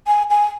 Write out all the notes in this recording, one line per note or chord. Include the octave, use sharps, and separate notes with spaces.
G#5
G#5